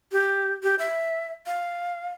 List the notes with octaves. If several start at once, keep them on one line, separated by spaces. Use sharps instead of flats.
G4
G4
E5
F5